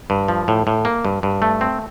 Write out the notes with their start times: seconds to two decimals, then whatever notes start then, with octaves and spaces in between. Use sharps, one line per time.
0.10 G2
0.28 F3
0.48 A2
0.67 A2
0.85 A#3
1.05 G2
1.23 G2
1.42 A3
1.61 C4